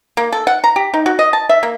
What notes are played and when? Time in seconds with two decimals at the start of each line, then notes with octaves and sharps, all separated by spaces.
0.17 A#3
0.32 A4
0.47 F#5
0.64 A#5
0.76 G4
0.94 D#4
1.06 F#4
1.19 D#5
1.33 A5
1.49 E5
1.63 A#3